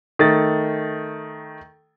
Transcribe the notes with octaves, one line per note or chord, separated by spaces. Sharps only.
D#3 A3 A6